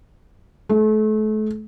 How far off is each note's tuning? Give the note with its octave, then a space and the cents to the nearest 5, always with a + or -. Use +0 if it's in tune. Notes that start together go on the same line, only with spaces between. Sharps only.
A3 -35